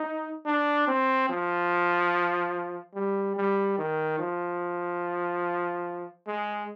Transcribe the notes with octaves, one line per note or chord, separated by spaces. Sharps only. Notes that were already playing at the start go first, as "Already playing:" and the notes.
Already playing: D#4
D4
C4
F3
G3
G3
D#3
F3
G#3